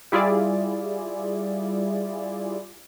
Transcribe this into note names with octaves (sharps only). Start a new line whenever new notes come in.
G3 E4 F4 G#4 D5